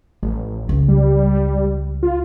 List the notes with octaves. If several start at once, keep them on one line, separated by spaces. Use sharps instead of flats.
A1 F3
C#2
G3
F4